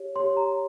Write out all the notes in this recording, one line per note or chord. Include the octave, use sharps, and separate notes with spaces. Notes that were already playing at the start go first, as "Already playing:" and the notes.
Already playing: G4 C#5
G4 C#5 C6
A#5